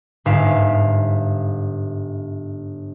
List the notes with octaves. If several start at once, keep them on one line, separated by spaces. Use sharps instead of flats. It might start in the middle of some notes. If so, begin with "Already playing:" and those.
G1 G#2 E5 F5